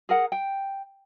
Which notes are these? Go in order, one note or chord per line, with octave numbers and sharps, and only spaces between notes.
G#4 A#4 F#5
G5